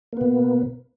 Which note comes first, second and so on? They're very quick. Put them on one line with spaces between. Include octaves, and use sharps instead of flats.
A#3 B3 B2